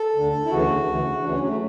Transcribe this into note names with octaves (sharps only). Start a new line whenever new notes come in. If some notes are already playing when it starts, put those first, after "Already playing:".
Already playing: A4
D2 D3
E4
D2 C#3 E3 F#4
D2 C#3 E3
D2 C#3 E3 D4
C#4
F#3
A3